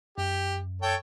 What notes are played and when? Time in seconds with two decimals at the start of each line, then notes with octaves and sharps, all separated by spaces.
0.18 F#2 G4
0.82 A4 C#5 G5